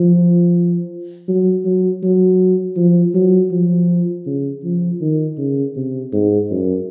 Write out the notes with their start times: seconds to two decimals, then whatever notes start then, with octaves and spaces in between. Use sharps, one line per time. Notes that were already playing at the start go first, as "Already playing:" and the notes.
Already playing: F3
1.28 F#3
1.65 F#3
2.03 F#3
2.76 F3
3.14 F#3
3.51 F3
4.26 C#3
4.64 F3
5.01 D#3
5.38 C#3
5.76 C3
6.13 G#2
6.51 F#2